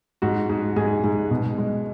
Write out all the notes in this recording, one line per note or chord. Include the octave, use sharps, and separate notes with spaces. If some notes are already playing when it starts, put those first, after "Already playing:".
G#2 F#4
G#2
G#2 G#4
G#2
B2
G#3